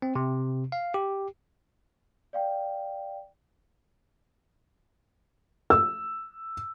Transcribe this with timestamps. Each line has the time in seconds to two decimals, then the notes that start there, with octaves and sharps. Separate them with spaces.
0.02 C4
0.15 C3
0.72 F5
0.94 G4
2.33 D5 F5 G5
5.70 E6